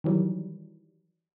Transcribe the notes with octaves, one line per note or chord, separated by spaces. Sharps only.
D#3 E3 F#3 G3